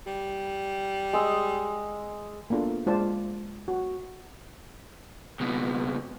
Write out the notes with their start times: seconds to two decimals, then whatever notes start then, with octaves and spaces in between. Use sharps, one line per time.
0.07 G3
1.13 G#3 D#6 E6
2.50 A#3 B3 D4 F4 A4
2.86 G#3 F4 C5 D5 A5
3.68 F#4
5.40 C#2 B2